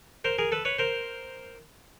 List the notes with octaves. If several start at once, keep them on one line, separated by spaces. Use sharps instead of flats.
A#4 C5
G#4 A#4
A4 B4
B4 C#5
A#4 C5